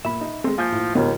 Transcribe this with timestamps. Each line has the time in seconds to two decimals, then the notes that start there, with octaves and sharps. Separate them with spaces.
0.05 A#2 E5 B5
0.21 D#4
0.44 G#3 C4 A4 C6
0.58 F3 A#3 G#5 G6
0.72 A2
0.95 D#2 G#2 C#3 F3 B3